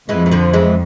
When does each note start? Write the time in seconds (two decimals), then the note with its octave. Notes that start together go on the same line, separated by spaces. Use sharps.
0.09 F2 E3 G#3
0.26 E3
0.31 D3 F3
0.53 E3 G#3